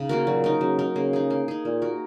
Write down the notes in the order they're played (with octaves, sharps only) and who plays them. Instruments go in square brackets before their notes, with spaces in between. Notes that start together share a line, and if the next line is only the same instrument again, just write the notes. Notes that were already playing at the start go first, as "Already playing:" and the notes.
Already playing: [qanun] C#3 D#4
A#3 F#4 A#4
[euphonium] A#2 [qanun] F#3
[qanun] D#4 A#4
[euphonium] C#3 [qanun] F#3
[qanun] D#4 A#4
[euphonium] C#3 [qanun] A#3
[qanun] D#4 G#4
A#3
D#4 G#4
[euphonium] A#2 [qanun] A#3
[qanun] F#4 A#4